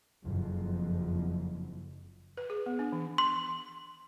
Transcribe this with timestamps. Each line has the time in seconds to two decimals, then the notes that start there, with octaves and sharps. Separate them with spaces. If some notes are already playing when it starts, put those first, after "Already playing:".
0.24 F#1 F2
2.37 B4
2.50 G#4
2.66 B3
2.79 D4
2.92 E3
3.18 C6